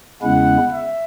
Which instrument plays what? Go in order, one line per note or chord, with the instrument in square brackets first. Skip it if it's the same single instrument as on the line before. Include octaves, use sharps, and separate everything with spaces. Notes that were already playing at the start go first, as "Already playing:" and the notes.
[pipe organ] E2 C#3 G#3 C#4 E4 [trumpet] F#5
[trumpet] E5